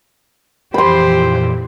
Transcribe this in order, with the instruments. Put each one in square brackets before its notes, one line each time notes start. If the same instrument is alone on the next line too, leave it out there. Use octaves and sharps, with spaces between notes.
[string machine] F2 A#2 E3 [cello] G4 C5 [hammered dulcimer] B5 C6